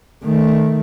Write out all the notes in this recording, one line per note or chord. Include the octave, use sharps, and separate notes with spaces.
D#3 A3